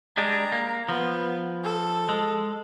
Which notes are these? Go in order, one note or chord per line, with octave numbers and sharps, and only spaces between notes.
G3 G#3 D4 A#5
A#3
F3 B3
A4
G#3